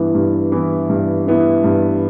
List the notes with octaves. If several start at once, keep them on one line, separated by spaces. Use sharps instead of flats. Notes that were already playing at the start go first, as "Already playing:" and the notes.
Already playing: G2 E3 B3 E4
G2
E3 B3 E4
G2
E3 B3 E4
G2